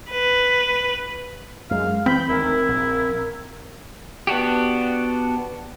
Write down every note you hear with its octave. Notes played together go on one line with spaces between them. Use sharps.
B4
F#2 G#3 F5
E3 C4 B5 G6
D2 D#3 E4 A#4
A#1
B3 D4 F#4 G4